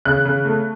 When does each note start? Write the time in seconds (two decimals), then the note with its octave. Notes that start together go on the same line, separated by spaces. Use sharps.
0.05 C#3 F#6
0.25 C#3
0.45 A3